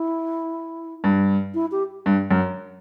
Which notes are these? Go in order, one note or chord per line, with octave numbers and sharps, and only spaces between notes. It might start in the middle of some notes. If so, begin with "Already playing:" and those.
Already playing: E4
G2
E4
G4
G2
F#2